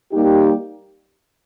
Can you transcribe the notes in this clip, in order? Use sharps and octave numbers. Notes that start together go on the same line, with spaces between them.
G3 A#3 D#4 G4